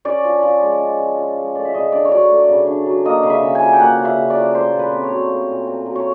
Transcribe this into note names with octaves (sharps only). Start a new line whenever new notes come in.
C#4 D5
F3
F3
G#3
C#4
F3
F3
G#3
A3 D5
E5
C#3 D#5
D4 D5
C#5
F#3 D5
A3
C#3
D4
F#3
A#3 D#5
C#3
E5
C#3
G#5
F3
G5
A#3 F#5
C#3
E5
C#3
D5
F3
A3 C5
A#2
B4
C4
C#5
F#3
A3
A#2
C4
F#3
C#5